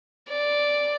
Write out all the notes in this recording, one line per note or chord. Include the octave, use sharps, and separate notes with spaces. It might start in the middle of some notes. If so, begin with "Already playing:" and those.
D5